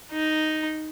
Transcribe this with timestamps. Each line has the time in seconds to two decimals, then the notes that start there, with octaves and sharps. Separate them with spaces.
0.13 D#4